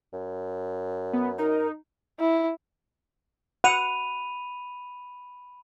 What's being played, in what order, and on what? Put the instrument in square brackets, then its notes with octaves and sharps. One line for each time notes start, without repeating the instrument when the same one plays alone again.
[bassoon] F#2
[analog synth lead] B3
[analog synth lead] D#4 [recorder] A#4
[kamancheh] E4
[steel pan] F#5 [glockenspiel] B5 D#7 F7